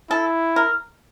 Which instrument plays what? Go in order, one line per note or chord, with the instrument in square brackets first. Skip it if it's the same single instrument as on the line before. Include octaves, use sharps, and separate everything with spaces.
[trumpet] E4 [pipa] A4
[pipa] A#4